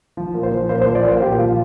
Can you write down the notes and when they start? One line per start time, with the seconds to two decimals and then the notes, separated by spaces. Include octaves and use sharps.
0.17 F3
0.34 A#2
0.43 C5
0.52 F3
0.69 A#2 C5
0.81 C5
0.86 F3
0.95 D5
1.04 A#2 C5
1.21 A#2 G4
1.39 F3 F4